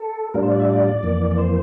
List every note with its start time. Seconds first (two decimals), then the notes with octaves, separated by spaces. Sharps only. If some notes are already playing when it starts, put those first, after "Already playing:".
Already playing: A4
0.34 A2 G3 D4 F4 A#4
0.43 C5
0.51 D5
0.60 E5
0.68 D5
1.03 F2 E3 A#3
1.31 D5
1.38 C5